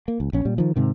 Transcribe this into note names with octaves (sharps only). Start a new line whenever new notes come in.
A#3
C#2
A#1 C#4
A#2 G3
D#3 F3
G#2 C3 D#3